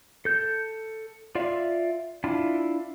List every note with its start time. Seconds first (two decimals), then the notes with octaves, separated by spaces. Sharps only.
0.25 A4 G6
1.35 F4 D5 E5 F5
2.24 D4 E4 F4